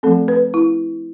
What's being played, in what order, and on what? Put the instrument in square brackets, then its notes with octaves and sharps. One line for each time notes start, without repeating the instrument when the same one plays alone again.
[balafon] F3 A3 C4 A4
B4
E4